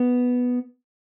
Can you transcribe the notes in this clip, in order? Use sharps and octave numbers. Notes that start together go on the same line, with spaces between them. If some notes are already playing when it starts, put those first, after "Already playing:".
Already playing: B3